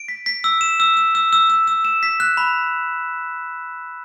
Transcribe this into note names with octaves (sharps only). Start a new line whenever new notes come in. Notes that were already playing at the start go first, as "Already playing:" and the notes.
Already playing: D7
B6
B6
E6
E7
E6
E6
E6
E6
E6
E6
E7
B6
F#6
B5